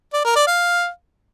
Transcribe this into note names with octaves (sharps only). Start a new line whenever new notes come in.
D5
A#4
D5
F5